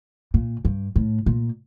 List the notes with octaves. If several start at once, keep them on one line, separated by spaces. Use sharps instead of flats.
A#2
G2
A2
A#2